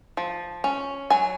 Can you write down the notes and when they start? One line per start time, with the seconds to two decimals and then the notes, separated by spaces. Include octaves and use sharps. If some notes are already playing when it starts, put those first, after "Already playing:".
0.17 F3
0.64 C#4
1.10 F#3 G#5